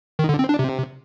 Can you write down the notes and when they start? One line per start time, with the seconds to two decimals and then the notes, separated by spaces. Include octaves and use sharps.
0.19 D#3
0.29 D3
0.39 C4
0.49 D4
0.59 C3